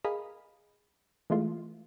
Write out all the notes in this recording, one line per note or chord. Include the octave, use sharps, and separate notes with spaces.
G#4 A#4 D#5 F5 B5
E3 G#3 A3 F4